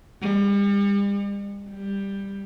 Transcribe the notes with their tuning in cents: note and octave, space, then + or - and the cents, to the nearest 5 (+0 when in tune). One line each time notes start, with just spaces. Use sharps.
G3 +40
G3 +10